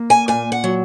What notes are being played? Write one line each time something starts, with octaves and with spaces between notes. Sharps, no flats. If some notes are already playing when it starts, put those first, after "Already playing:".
Already playing: A#3
G#5
A#2 G#5
F#5
F#3